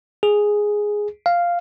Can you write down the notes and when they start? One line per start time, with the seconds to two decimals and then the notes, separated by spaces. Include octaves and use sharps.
0.23 G#4
1.26 F5